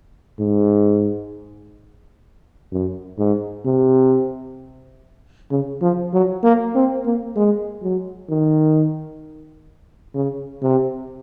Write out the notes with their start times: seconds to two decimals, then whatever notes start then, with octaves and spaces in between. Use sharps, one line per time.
0.39 G#2
2.72 F#2
3.18 G#2
3.65 C3
5.51 C#3
5.82 F3
6.13 F#3
6.44 A#3
6.75 C4
7.06 A#3
7.36 G#3
7.83 F#3
8.30 D#3
10.15 C#3
10.62 C3